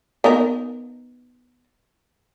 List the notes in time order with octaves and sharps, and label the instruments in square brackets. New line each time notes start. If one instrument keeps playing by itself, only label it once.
[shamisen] B3 D#4 A#4